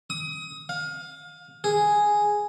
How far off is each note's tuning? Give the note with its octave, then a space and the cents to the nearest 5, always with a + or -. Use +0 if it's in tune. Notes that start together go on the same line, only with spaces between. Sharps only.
D#6 +25
F5 +25
G#4 +0